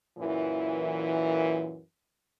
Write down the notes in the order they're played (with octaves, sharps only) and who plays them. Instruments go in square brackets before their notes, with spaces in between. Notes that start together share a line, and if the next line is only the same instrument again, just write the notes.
[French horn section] F#2 A#2 E3